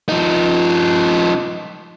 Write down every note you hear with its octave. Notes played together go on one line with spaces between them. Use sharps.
F3 D#4